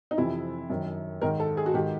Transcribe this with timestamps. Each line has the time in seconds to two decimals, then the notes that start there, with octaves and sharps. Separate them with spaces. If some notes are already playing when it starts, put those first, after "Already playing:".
0.11 D#4
0.17 F2 C3 E3 E4
0.70 F#2 D#3
1.21 G#2 D#3 A#4
1.40 A4
1.57 G#4
1.66 F#4
1.74 G#2 D#3 G4